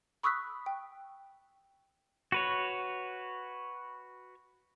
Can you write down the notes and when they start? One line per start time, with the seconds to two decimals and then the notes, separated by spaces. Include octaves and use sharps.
0.23 B5 C#6 D#6 E6 F#6 B6
0.66 G5
2.32 F#4 B4 C#5